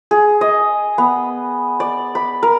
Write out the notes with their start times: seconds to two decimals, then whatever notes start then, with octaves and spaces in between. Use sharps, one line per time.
0.11 G#4
0.41 D#5
0.98 B3
1.80 D5
2.15 B5
2.43 A#4